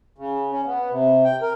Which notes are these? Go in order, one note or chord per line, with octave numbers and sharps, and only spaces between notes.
C#3
C#4
B3
C3
G5
A#4